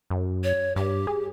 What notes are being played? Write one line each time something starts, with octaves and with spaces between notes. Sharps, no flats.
F#2
C#5
G2 G4
G#4